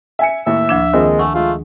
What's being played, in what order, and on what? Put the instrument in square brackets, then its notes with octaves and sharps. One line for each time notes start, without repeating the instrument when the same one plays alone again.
[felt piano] E5 G#5 C#7
[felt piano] D#2 A2 [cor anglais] E5
[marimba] D2 F3 D4
[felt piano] F2 A#3 C4 [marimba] D#3 [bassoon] G#3
[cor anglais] A3 [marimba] F#5 G#5 C#6
[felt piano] G#3 [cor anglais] A3 [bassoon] F4